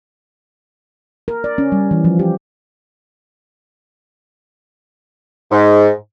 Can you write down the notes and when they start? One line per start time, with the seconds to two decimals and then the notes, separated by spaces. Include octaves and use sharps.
1.28 A#4
1.44 D5
1.58 C#4
1.72 G3
1.91 E3
2.05 F3
2.19 G4
5.51 G#2